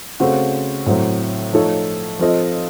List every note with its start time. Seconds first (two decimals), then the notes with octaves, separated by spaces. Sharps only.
0.20 C#3 A3 C4 F#4
0.86 A2 F#3 C4
1.53 F3 A3 D#4 A4 C#5
2.19 F3 C4 F4 A4 D#5